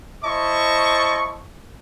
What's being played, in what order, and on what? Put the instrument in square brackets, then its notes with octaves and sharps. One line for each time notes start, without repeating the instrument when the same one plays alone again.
[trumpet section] E4 C5 D#5 A5 C#6